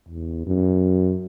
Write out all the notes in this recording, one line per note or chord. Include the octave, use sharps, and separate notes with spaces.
E2
F#2